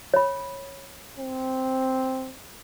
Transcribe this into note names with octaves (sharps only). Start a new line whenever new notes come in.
C#5 B5
C4